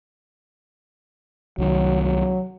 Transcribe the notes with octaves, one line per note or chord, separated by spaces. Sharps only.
C2 D#3 F#3
F#3